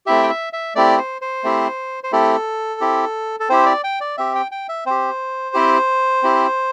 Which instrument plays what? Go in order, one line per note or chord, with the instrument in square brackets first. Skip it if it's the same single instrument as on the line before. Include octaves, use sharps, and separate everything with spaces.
[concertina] A3 C4 E4 G4 E5
G5
E5
E5
A3 C4 E4 G4 D5
C5
C5
A3 C4 E4 G4
C5
A3 C4 E4 G4 A4
C4 E4 G4
A4
C4 E4 G4 C5
D5
G5
D5
C4 G4 E5
G5
G5
E5
C4 G4 C5
C4 E4 G4
C4 E4 G4